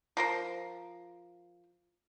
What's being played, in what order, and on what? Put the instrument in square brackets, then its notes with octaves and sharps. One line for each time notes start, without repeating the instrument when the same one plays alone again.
[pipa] F3 A#4 C5